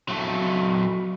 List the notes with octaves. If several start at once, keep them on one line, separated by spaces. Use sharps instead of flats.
F#3 A3